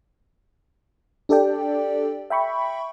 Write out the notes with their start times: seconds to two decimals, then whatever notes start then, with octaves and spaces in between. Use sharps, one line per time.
1.29 D4 G4 A4 D5 G5
2.30 E5 G5 B5 C#6